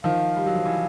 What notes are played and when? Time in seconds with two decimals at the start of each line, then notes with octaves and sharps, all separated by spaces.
0.04 D#3 F3 F5
0.36 G3
0.46 F#3
0.55 F3
0.65 E3